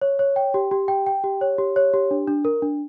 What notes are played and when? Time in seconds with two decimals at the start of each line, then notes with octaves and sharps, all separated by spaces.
0.01 C#5
0.19 C#5
0.36 G5
0.54 G4
0.71 G4
0.88 G5
1.06 G5
1.24 G4
1.41 C#5
1.58 G4
1.76 C#5
1.94 G4
2.11 D4
2.28 D4
2.45 A#4
2.62 D4